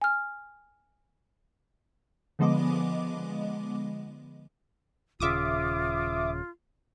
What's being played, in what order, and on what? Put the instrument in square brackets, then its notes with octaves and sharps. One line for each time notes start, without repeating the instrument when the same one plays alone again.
[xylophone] G#5 F6
[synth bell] D3 F3 G#3 B3 D#5 D6
[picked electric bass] D#1 C#3 [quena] F4 [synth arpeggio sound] E5 D6 D#6